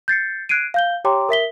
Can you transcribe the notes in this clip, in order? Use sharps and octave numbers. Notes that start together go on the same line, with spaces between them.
G6 A6 C7 C#7
F#6 G#6 C7 D7 D#7
F5 G6 G7
G4 C#5 G5 A#5 C6 D6
A#4 E5 B6 G7